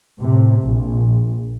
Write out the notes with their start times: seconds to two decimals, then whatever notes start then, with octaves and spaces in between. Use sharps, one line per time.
0.20 A2 C3
0.63 A#1